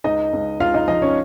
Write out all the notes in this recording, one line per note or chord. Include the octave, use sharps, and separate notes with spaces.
C#2 D#4 D#5
C#2
C#2 F4 F5
D#4 D#5
F3 D#4 D#5
C#4 C#5